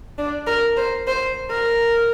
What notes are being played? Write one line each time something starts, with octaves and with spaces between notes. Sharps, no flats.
D4
A#4
C5
C5
A#4